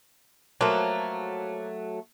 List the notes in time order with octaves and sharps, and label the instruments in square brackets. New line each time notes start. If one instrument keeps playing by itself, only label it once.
[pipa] F3 A#3 [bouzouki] F#3 A3